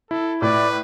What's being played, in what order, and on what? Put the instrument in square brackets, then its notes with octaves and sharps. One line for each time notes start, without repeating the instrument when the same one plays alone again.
[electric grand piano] E4 [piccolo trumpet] A4
[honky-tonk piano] A2 [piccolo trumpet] B4 [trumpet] D5